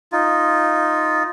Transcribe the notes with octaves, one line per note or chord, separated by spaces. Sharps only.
D#4 F4